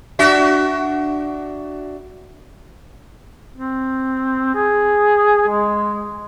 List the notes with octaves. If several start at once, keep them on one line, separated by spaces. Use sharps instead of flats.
D4 F#4 E5
C4
G#4
G#3